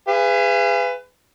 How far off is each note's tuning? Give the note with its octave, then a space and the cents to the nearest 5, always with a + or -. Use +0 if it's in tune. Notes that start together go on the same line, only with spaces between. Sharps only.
G#4 -20 B4 +20 F5 -40